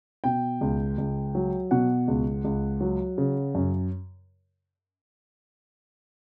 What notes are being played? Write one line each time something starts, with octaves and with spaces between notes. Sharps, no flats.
B2 G5
C#2
C#2
F#3
B2 F#5
C#2
C#2
F#3
C#3
F#2